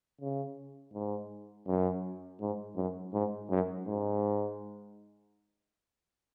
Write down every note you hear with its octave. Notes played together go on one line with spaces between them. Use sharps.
C#3
G#2
F#2
G#2
F#2
G#2
F#2
G#2